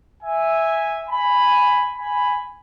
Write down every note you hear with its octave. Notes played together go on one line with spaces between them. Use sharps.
E5 G#5
G#5 B5
G#5 B5